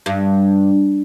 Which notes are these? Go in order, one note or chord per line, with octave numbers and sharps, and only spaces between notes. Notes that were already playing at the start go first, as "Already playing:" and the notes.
G2